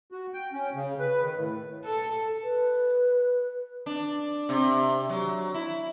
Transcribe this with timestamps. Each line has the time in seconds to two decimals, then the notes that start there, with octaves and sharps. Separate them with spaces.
0.12 F#4
0.34 G5
0.52 C#4
0.75 C#3
0.99 B4
1.22 D#3
1.37 A2
1.85 A4
2.43 B4
3.86 D4
4.49 C3
5.09 F#3
5.54 E4